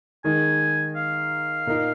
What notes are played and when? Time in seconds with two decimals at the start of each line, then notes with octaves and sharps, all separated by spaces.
0.24 D#3 G#3 D#4 A#4 G#5
0.96 F5
1.67 A#2 A#3 D#4 A#4